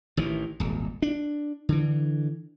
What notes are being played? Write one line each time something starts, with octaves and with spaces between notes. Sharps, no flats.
A1 D#3 E3
D#1 G#1
D4
D3 E3